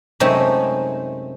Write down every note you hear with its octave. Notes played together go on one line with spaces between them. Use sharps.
F#2 C3 G#3 A3 C4 D#4